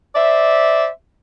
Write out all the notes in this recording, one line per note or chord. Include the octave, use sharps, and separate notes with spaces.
C5 D5 E5